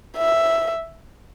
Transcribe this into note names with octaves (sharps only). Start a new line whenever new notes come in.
E5